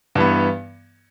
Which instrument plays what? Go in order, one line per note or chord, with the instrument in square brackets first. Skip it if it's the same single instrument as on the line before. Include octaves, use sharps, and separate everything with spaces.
[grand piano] G2 E3 B3